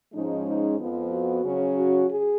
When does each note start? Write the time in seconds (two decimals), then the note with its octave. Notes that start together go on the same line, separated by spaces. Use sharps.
0.13 G#2 F3 G#3 C#4 D#4
0.46 D#4
0.79 F2 F3 B3
1.11 F#4
1.43 C#3 F#3 C#4
1.76 F#4
2.08 G#4